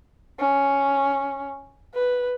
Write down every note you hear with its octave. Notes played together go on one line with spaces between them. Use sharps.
C#4
B4